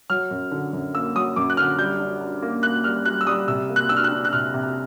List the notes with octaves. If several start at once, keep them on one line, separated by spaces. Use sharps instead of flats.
F#3 F6
F#2
D3
F#2
A#3 E6
F#3 D#6
F#2 D6
F#6
D3 F6
G3 G6
D4
D4
A#3
A#3 F#6
G3 F6
G3 F#6
E6
G3 D#6
C3 E6
A#3
F#6
D4 E6
F6
F#6
D4
F#6
C3 F6
C3